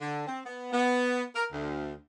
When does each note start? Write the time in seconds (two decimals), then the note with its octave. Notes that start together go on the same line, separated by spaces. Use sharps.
0.01 D3
0.27 C4
0.46 B3
0.73 B3
1.36 A#4
1.52 D2